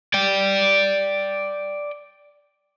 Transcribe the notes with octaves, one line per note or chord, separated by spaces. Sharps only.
D5 G5